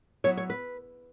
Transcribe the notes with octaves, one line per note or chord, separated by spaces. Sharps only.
F#3 B3 E4 C#5
C#5
B4